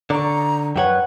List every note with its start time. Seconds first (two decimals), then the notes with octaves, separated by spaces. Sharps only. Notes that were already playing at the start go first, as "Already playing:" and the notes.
0.10 D3 D5 A#5 C#6
0.76 F#2 F#4 B4 C#5 F#5 G5